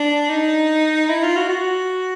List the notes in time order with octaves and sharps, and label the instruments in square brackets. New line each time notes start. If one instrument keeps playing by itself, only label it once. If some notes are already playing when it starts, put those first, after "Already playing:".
Already playing: [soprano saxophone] D4
D#4
E4
F4
F#4
F#4